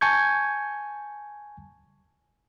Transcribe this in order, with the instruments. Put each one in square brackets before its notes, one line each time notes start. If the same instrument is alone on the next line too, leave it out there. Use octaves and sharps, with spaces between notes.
[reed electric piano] G#5 A5 C#6 G6 G#6